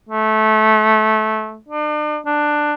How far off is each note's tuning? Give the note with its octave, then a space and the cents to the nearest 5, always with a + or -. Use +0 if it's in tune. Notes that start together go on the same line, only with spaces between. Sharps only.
A3 -20
D4 +40
D4 +15